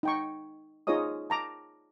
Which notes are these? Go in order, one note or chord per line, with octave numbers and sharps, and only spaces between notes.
D#4 G5 C#6
D#4 F4 G#4 C#5 D#5 D#6
A5 A#5 D6